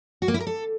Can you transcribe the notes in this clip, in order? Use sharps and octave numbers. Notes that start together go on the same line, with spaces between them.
F#4
A#3
E4
A#4
A4